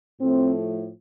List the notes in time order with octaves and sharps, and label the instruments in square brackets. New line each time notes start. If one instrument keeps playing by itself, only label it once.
[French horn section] A2 F3 A3 C4